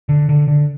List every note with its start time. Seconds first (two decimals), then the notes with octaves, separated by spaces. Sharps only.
0.09 D3
0.29 D3
0.48 D3